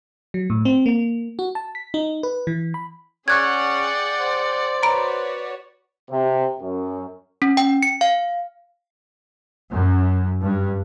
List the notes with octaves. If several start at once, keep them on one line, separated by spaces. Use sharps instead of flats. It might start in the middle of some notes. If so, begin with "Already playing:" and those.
F#3
A2
C4
A#3
F#4
A5
B6
D#4
B4
E3
B5
C#4 G#4 D5 F#5 G5 C#6 F#6 G#6
C5
F#4 B4 C#5 A#5 B5 D7
C3
F#2
C#4
G5
C#7
F5
F#2
G2